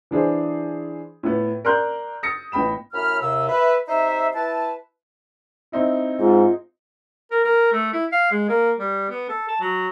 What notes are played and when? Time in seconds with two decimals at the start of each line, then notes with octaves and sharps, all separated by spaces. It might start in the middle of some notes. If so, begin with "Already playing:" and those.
0.11 E3 D4 G#4 C5
1.23 A2 B3
1.65 A#4 D5 A#5 C6 F#6 G6
2.23 D#6 A6 A#6 C#7
2.52 A1 B3 G5 B5 E7
2.94 F#2 A2 B5 F6
3.20 D#2 C3 E6
3.49 B4 E5
3.88 C3 D#4 C5 E5
4.35 E4 B4 A5
5.72 C4 D#4 E4
6.19 G#2 F4
7.31 A#4
7.44 A#4
7.73 A3
7.93 E4
8.12 F5
8.31 G#3
8.49 A#3
8.79 G3
9.10 B3
9.29 A4
9.49 A5
9.60 F#3